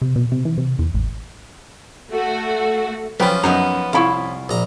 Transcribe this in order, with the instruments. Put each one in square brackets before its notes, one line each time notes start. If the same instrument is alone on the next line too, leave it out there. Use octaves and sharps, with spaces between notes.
[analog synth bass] C3
B2
C3
E3
C3
E2
A1
[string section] A3 F#4
[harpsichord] F3 C#4 [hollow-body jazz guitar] F#3 [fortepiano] B4 G5 B5
[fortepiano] F#2 [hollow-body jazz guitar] B3 D#4 A#5
[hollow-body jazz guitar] C2 E4 [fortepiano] F4 B5 C#6
[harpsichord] A#1 A#5